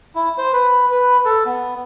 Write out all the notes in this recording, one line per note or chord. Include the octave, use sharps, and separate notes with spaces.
E4
C5
B4
B4
A4
B3